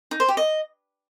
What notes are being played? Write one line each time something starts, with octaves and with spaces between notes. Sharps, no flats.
D#4
C5
G4
D#5